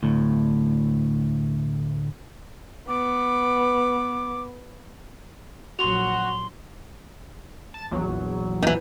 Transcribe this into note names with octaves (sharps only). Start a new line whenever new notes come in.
D2 A2
B3 D6
A#1 F#3 F#4 C6 F7
A5 A6
A#1 E2 F#3
D#3 E3